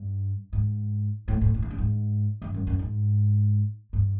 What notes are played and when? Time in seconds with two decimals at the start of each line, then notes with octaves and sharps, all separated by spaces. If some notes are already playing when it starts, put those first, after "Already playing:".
Already playing: G2
0.53 G#2
1.28 A2
1.41 A2
1.54 A2
1.62 G#2
1.70 G2
1.78 G#2
2.42 G2
2.54 F#2
2.67 F#2
2.79 G#2
3.93 G2